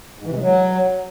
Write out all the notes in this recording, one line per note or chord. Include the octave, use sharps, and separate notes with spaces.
G#2
E3
C3
G#3
F#3